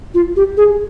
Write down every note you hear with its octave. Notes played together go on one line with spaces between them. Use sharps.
F4
G4
G#4